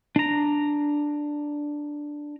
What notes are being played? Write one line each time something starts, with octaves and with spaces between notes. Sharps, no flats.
D4 A#5